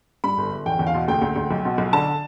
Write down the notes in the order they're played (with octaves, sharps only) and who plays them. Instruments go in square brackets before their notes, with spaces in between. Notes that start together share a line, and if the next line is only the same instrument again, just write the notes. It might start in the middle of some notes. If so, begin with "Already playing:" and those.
[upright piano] G2 B5
G1
G1
E2 G5
E2
F5
B2
D2 G5
D2
D2
B1
B2
B1
D3 A5